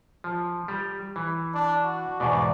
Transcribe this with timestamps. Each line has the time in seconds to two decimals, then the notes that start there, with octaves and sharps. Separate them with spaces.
0.24 F3
0.68 G3
1.16 E3
1.54 D4
1.84 F#4
2.20 E2 G#2 B2 D5